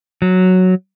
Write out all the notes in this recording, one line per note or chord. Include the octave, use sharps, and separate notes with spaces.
F#3